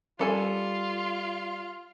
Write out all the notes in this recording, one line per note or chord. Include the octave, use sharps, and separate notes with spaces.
G3 F4 A4 G#5